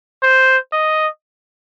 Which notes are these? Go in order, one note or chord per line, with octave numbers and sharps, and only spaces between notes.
C5
D#5